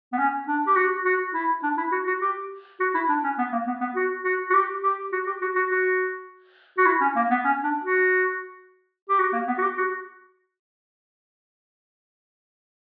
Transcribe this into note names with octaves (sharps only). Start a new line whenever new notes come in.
B3
C#4
D4
G4
F#4
F#4
E4
D4
E4
F#4
F#4
G4
F#4
E4
D4
C#4
B3
A#3
B3
B3
F#4
F#4
F#4
G4
G4
F#4
G4
F#4
F#4
F#4
F#4
E4
C#4
A#3
B3
C#4
D4
F#4
G4
F#4
A#3
B3
F#4
G4
F#4